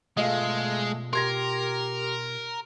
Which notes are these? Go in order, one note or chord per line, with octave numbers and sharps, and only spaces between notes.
B2 G#3 A3 F4 D#5 F5 G#5
G4 A#4 C6 G#6 A#6